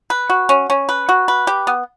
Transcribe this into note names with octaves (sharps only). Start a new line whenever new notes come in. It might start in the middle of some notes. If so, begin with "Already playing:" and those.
B4
F#4
C#4
C#4
B4
F#4
B4
G4
B3